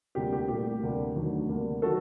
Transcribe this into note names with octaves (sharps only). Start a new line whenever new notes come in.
D2 C3 G3 A#3 G4
G4
C2 A#2 A3 G4
D2 C3 G3 A#3
D#2 D3 F#3 A3
D2 C3 G3 A#3
D#3 F#3 F#4 A4